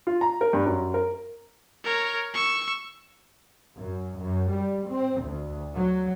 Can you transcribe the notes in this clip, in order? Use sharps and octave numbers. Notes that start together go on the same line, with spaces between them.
F4
A#5
A#4
G2
F#2
A#4
A#4 C#5
C#6 E6
F#2
F#2
G3
C4
D2
F#3